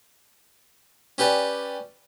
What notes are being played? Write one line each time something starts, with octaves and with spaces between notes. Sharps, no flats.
C#4 G4 B4 D5